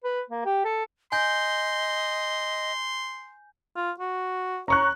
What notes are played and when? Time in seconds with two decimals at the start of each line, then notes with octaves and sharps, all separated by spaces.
0.04 B4
0.30 A#3
0.45 G4
0.65 A4
1.12 D#5 G#5 C6 G6
3.76 F4
3.99 F#4
4.68 C#5 A#5 C#6 F#6